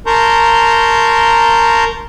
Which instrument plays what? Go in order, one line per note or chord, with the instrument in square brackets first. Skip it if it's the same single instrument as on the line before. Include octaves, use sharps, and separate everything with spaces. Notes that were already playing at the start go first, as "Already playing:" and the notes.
[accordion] A#4 A5 A#5 C6 C#6 G6